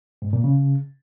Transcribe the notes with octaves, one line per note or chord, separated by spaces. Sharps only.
G#2
A#2
C#3